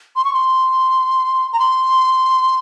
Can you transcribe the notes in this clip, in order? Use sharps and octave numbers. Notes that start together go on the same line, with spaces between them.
C6
C#6
C6
A#5
C6